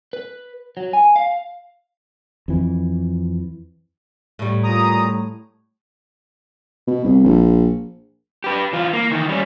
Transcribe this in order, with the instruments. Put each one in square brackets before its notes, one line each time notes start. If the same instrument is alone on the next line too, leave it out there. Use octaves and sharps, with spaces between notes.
[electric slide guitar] B4
F#3
G#5
F5
[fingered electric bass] F2 E3
[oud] A2 G3
[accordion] A#2 A#5 D#6
[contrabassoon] B2
C2
A#1
[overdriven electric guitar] G4 B4
E3 F4
A#3
D#3 E3
G3 C#4